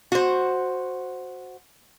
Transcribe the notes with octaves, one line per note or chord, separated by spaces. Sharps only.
F#4 C5